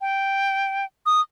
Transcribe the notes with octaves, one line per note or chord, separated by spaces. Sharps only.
G5
D#6